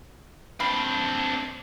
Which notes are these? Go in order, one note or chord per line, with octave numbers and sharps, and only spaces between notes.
C4 D4 F5 B5